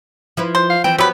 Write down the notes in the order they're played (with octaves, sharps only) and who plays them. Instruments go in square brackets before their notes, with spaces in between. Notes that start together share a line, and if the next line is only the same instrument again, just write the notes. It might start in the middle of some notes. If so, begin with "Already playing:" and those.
[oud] F3 E4 B4
[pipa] C5
[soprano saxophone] F5
[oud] E3 C4 [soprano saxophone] G5
[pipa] F#3 B4 [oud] B3 [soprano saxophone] G4